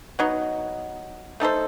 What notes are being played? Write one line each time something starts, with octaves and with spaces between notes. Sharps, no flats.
F#3 B3 D#4
A3 D#4 A4 C5